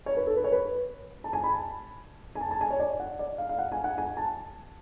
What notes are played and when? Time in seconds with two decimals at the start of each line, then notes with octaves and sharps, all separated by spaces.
0.06 C#5
0.17 B4
0.27 A4
0.36 B4
0.44 C#5
0.52 B4
1.24 A5
1.33 G#5
1.44 B5
1.53 A5
2.35 G#5
2.41 A5
2.51 A5
2.61 G#5
2.70 C#5
2.80 D5
3.00 F#5
3.19 D5
3.38 F5
3.49 F5
3.59 F#5
3.72 G#5
3.84 F#5
3.98 G#5
4.17 A5